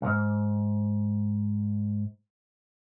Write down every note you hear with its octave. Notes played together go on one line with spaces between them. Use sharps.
B1 G#2